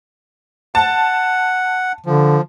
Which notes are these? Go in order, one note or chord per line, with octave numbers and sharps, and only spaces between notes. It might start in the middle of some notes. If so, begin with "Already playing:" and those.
F#5 A5
D3 F3